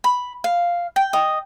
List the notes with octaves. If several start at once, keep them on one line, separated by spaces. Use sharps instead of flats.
B5
F5
G5
D#5